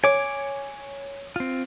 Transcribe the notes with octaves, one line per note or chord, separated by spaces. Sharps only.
C#5 G#5 D6
C4 F4